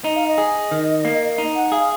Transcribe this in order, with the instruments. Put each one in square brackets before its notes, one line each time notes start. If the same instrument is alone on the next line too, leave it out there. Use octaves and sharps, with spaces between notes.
[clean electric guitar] D#4 [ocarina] D#5
[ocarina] F5
D#5
[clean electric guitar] G#4
D#3
A#3
D#4
[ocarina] F#5
[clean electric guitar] G#4 [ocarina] F5